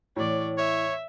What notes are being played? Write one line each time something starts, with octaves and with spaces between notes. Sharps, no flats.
A2 E3 C#5 D5
C#5 E5